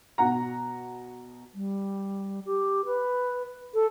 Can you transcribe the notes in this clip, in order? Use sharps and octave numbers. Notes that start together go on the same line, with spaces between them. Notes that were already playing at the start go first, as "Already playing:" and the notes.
B2 F#5 A#5
G3
G4
B4
A4